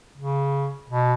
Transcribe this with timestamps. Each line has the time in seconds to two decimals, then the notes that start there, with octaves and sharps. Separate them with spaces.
0.18 C#3
0.89 B2